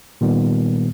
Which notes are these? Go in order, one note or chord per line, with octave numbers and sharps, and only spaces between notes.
A#2 D#3 G3 B3